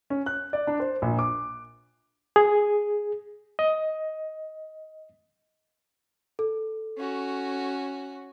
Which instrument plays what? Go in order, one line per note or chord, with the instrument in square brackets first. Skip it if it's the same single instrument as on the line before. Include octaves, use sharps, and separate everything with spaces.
[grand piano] C#4
F#6
D5
D4
C5
A#1
D6
[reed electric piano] G#4
D#5
[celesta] A4
[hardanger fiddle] C#4 F#4